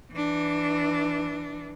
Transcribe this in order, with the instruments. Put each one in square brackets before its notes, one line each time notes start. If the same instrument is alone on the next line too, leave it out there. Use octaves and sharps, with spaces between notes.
[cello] E3 D4